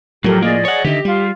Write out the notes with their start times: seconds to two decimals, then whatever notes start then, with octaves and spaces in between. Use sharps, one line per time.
0.24 A2 F3 F#3 G4 A4 A#4
0.42 A#3 G#4 D5 D#5
0.65 C#5 F#5
0.84 D3 D#3 G4 D#5 E5
1.05 G3 F4